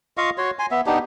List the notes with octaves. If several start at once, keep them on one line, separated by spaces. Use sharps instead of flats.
F4 D#5 F5 C#6
F#4 C#5 C6
G#5 C6
B3 E5
B3 D4 D#4 G4